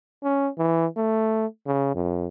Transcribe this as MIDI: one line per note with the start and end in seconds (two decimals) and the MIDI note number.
0.24 0.49 61
0.58 0.86 52
0.97 1.46 57
1.67 1.92 49
1.95 2.28 41